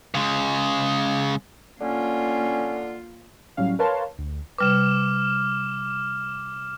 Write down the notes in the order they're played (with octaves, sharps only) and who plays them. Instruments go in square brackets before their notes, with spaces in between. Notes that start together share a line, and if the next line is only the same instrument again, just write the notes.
[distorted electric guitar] C#3 G#3
[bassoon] D3 [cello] A#3 F4 [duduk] C#4
[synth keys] A2 F#3 G3 C#4 F5
A#4 B4 C#5 F5 A5 C6
D2
[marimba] C3 G3 B4 [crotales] D6 F6 E7